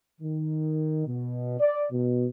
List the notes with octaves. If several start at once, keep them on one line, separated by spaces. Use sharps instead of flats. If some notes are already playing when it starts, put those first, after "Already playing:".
D#3
B2
D5
B2